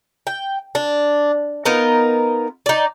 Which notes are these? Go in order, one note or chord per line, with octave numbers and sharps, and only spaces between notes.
G5
D4
B3 D#4 F4 A#4
D#4 D5